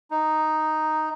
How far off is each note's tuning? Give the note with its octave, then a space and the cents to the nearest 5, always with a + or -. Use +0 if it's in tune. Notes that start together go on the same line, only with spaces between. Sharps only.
D#4 +0